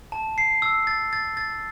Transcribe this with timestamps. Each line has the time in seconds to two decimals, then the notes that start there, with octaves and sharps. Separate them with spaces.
0.12 A5
0.38 C7
0.62 E6
0.87 A6
1.13 A6
1.37 A6